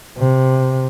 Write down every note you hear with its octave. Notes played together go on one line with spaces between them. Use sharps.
C3